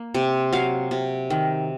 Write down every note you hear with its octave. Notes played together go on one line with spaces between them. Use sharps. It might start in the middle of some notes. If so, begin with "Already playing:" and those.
Already playing: A#3
C3
F#3 F5
C3
D#3